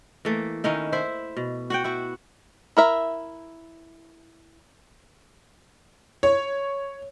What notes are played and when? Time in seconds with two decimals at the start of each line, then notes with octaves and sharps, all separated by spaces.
0.25 E3 A3 A#3
0.64 D#3 C#4 D#4 E4
0.92 E4 C5 E5
1.37 B2
1.70 F#4 F#5 G5
1.84 E4 F#4
2.77 E4 A#4 E5
6.23 C#5